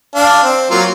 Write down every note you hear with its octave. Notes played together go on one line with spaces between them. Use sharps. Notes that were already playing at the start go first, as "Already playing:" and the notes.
D4 F5
C4
F#3 A#3 F4